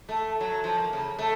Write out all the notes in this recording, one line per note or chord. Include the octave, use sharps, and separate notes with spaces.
A3
F#3
F3
A#3
C#3
A3